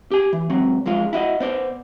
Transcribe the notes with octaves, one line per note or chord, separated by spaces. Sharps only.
G4 G#5
E3
C#2 F#3 C4
F#2 F3 G#3 F4
E4 F#4 D#5
B3 C5 D5